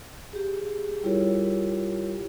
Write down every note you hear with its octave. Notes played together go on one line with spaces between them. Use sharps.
G4 G#4
G3 E4 F4 G4 A#4 C#5